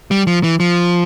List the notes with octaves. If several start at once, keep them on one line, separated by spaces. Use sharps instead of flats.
G3
F3
E3
F3